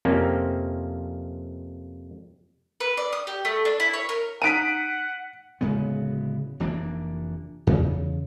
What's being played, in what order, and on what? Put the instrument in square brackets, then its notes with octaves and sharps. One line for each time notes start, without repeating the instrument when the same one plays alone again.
[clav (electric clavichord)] F2 C3 A#3 C4 C#4
[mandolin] B4
D5
D#6
G4
A3
D4
E4
C#5
A#4
[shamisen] D#4 A#5 [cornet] F#5 [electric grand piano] B6 D7 D#7
[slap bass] D1 C#3 G#3 B3
F1 E3 A#3 D4
E2 C#3